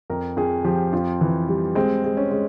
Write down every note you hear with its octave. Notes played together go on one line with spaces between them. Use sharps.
F2 A#4
F2 G#4
F3 G4
F2 F4
E3
G3
G#3 C4
G#3
C#4
G#3